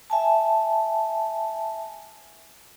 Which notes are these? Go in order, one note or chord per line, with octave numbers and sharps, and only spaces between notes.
E5 G#5 A5